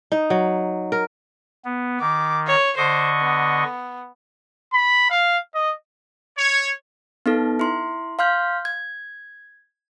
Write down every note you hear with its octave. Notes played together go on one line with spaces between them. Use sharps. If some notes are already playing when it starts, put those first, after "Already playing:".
D#4
F#3
A#4
B3
D#3 D6
C#5
D3 C5 D#5 C#6
B3
B5
F5
D#5
C#5
B3 D#4 A4
E4 C6
F5 C6 F6 G6
G#6